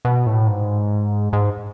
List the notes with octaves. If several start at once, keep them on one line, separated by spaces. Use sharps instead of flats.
B2
A2
G#2
G#2